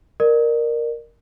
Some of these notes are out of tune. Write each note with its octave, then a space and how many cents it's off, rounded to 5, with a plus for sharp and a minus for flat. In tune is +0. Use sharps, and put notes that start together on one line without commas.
A#4 +0 D5 +40